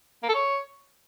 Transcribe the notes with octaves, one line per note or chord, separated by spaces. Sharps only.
A#3
A4
C#5